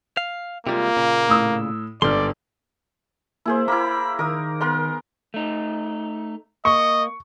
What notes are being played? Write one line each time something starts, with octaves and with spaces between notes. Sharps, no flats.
F5
C3 G3 G#3 A#3 F4
A#2 C#3
A2 D#6 E6
G1 G#2 G3 D5 C6 F6
A#3 E4 G#4 C5
A#3 E4 B5
D#3 A#4 D#6
B3 A#4 C6
A3 D#4
A#3 D#5 C#6